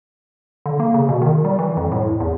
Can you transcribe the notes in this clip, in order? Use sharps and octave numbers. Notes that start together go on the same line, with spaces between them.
D3
A#3
C#3
B2
D#3
G3
E3
F2
A2
E2